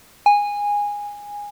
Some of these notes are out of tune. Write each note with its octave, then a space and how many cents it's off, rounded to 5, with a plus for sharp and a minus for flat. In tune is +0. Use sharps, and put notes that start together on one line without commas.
G#5 -15